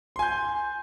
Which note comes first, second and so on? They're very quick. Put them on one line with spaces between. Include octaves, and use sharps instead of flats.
C6 G#5 G6